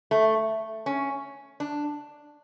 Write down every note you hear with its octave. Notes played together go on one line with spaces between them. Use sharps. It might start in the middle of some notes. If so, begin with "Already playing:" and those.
A3
C#4
D4